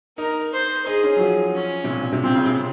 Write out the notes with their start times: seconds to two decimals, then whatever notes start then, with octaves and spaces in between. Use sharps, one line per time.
0.17 D#4 A#4
0.52 C5
0.86 D#4 G#4
1.04 C#4
1.16 F#3
1.21 F3
1.55 C#4
1.84 C3
1.89 A#2
2.01 A#2
2.13 C3
2.23 A#2 C4
2.35 C#3
2.46 C3